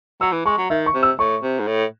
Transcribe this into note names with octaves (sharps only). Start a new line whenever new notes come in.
F#3 E6
E3
G#3 C#6
F#3
D#3 E5
C#6
C3
E6
A2 C#6
C3
G#2
A2